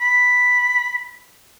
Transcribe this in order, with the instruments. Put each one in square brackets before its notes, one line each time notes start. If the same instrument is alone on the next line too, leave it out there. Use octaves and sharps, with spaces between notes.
[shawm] B5